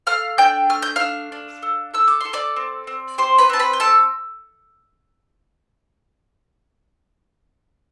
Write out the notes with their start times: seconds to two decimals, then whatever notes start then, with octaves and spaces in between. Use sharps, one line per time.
0.07 A3 F5 F6
0.38 D4 G5 G6
0.70 A3 F6
0.82 G6
0.96 D4 F5 F6
1.32 D4
1.62 A4
1.94 A4 E6
2.08 D6
2.21 A4 C6
2.33 D5 D6
2.56 C4
2.87 C4
3.18 G4 C5 C6
3.38 B4 B5
3.50 C4 A5
3.59 B4 B5
3.73 G5
3.80 C4 A4 A5